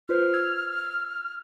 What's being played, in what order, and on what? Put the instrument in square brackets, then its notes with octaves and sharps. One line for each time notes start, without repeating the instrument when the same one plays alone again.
[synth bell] F4 B4 C5 [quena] F6
[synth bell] E6 G#6 F7